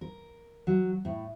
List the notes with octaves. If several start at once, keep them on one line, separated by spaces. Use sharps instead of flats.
A#4
F#3
A2